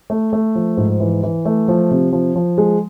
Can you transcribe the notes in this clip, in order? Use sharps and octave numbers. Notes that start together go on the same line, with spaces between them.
A3
A3
F3
G#2
E3
E3
A3
F3
C3
F3
F3
G#3